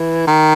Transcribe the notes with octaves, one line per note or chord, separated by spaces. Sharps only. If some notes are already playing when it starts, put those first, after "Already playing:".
Already playing: E3
D#3